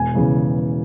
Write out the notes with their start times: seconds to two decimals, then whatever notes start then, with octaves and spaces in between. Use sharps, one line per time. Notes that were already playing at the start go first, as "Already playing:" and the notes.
Already playing: E1 G#5
0.15 E2 C#3